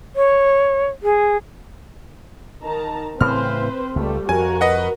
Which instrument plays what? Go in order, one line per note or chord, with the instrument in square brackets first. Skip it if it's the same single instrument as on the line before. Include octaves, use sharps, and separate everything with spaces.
[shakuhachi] C#5
G#4
[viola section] D#3 A5 A#5
[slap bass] A2 C#3 E3 [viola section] C4 B4 C5 [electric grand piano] F6
[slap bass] C#2 [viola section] G3 A3
[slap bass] F2 [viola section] F#4 A#4 [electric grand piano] G#5
[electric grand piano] B4 D#5 F#5